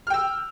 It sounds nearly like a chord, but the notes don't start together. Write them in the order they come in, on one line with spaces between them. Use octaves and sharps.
F6 G5 E6